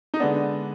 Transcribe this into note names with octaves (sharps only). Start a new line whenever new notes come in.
D#4
D3 G#3 B3 D4